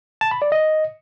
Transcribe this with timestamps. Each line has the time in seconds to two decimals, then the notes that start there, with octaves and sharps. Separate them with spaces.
0.21 A5
0.31 B5
0.42 D5
0.52 D#5